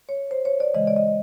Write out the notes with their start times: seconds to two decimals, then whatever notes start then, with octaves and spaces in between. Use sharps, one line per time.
0.09 C#5
0.31 C5
0.45 C#5
0.60 D5
0.74 C#3 E3 G#3 D#5
0.87 D5
0.96 D#5